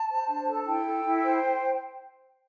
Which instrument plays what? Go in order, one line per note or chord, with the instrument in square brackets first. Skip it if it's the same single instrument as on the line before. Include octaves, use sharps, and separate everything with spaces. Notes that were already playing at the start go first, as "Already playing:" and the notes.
Already playing: [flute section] A5
C5
D4
A4
E4 G5
A4
E4
C5